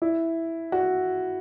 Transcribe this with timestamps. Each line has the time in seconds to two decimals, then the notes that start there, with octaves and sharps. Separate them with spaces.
0.02 E4
0.72 F#4